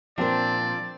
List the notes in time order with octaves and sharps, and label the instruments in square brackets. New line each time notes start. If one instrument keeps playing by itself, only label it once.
[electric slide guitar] A#2 D4 [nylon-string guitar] F3 A#4 [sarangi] C4 [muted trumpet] D5